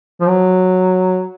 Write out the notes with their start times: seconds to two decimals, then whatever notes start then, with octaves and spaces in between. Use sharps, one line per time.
0.21 F3
0.28 F#3